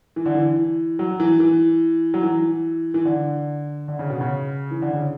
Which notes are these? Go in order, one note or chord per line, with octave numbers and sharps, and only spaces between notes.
E3
D3
E3
F#3
E3
E3
F#3
E3
E3
D3
D3
C#3
B2
C#3
E3
D3
C#3